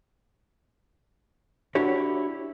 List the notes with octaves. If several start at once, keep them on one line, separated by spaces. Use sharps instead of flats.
D4 E4 F#4 G4 C#5